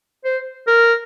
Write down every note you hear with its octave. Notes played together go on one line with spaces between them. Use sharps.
C5
A#4